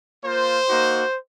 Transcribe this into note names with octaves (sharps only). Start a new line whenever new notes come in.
A#3 F4 C5
A#3 D#4 F#4